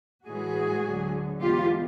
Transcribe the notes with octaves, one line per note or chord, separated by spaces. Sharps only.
A2 E3 G#3 F#4 G#4
D2 D3 F#3
E2 B2 G#3 F4 G4